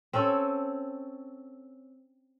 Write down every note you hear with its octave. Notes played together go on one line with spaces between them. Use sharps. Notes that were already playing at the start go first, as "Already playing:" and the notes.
C4 C#4 A4 C#5